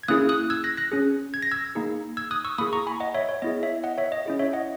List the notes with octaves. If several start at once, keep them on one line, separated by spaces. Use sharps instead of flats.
G#6
A#3 C#4 E4 G#4 D#6 F#6
D#6 F#6
E6 G#6
F#6 A#6
F#6 A#6
C#4 G#4
G#6
A#6
E6 G#6
A#3 D#4 G#4
E6 G#6
D#6 F#6
C#6 E6
A#3 E4 G#4 B5 D#6
A#5 C#6
G#5 B5
D#5 F#5
C#5 E5
C#5
B3 E4 G#4 D#5
C#5 E5
D#5 F#5
C#5 E5
D#5
C#4 E4 G#4 D#5
C#5 E5
D#5 F#5